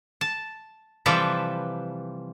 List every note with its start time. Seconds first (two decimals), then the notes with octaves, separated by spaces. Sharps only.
0.21 A5
1.06 C3 E3 F3 G3 A4 B4